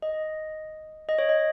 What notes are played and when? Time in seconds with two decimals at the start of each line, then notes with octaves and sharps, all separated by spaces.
0.02 D#5
1.09 D#5
1.19 C#5
1.29 D#5